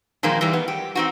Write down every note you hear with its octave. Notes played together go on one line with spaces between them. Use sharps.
A#2 D#3 F3 G#3 A#3
E3 G3
B3
G4
C4 D#4 F#4